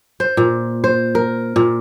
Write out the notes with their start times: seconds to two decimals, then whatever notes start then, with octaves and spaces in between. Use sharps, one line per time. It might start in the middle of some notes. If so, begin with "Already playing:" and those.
0.20 C5
0.37 A#2
0.84 C5
1.15 A#4
1.56 A#2